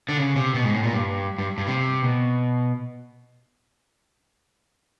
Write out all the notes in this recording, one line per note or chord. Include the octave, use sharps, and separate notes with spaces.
D3
C#3
C3
B2
G#2
A2
A#2
G2
G2
G2
C3
B2